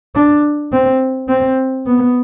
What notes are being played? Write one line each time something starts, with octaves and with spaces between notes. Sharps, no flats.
D4
C4
C4
B3